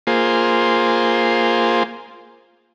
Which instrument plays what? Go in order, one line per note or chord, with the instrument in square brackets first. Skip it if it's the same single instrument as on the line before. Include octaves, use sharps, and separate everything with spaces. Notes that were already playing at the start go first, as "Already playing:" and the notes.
[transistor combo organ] A#3 F4 G#4 C5